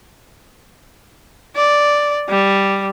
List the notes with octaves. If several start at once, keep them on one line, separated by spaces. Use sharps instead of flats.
D5
G3